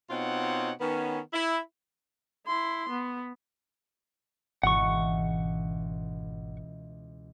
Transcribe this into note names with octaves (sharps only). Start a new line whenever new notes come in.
B2 C4 D#4 F4 C#5 F#5
D#3 B3 C#4
E4
E4 C6
B3
G#1 C#2 B2 E3 F#5 C#6